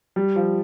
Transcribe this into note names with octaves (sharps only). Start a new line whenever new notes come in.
G3
F3